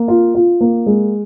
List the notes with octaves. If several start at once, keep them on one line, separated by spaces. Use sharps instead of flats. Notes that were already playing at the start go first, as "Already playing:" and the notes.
Already playing: A#3
F4
F4
A#3
G#3